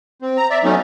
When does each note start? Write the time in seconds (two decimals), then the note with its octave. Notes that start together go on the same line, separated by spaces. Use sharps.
0.22 C4
0.37 A#5
0.50 D5 E5
0.64 F#3 A3 B3 C#4 D#4